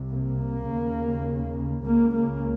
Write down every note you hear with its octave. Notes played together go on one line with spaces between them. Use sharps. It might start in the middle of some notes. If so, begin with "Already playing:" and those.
Already playing: C2 C3
A#3
D#2 C#3
C#2 C#3 A#3
A#3